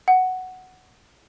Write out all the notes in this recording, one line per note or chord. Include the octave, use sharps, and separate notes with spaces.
F#5